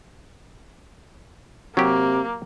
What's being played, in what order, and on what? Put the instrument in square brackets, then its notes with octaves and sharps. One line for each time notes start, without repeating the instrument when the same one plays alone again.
[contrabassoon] C3 [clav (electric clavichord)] F#3 G4 [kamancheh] A#3